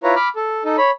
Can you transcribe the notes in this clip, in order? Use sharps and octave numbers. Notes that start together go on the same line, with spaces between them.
E4 F4 B4 C#5 A#5
B5 D6 F6
A4
D#4 A4
C#5 B5